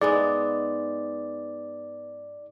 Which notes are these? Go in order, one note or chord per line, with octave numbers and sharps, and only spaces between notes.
G#2 G#3 B3 D5